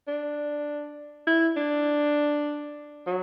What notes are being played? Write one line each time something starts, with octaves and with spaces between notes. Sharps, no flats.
D4
E4
D4
F#3